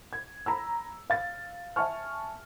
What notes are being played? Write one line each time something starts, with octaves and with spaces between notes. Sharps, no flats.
G#6
A#5 B5 E6
F5 A6
E5 G#5 A5 C#6 F6